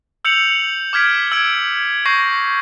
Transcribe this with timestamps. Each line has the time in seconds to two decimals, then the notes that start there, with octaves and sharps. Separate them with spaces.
0.25 E6 G6 C#7 F7 F#7
0.93 D6 F6 G#6 B6 D7
1.32 E6 G#6 D7
2.06 C#6 G6 A#6 C7